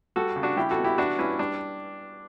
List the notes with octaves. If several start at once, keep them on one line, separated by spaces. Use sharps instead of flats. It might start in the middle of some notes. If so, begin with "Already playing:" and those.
G3 F#4 A4
C#3
D4 F#4
G3 E4 G4
F#4 A4
B2
E4 G4
E3 D4 F#4
G2 C#4 E4
G3 D4